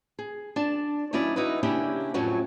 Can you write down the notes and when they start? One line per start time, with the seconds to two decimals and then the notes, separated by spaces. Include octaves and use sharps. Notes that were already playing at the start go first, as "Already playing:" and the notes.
0.19 G#4
0.56 D4 A5
1.13 D#3 F#3 C#4 E4 D5
1.36 D#4 E4 F#4 B4
1.63 C#3 A#3 C#4 D4 E4 G4
2.14 F2 A2 F#3 C#4 F#4